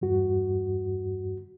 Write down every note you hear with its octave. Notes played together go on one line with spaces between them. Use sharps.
E2 G2 F#4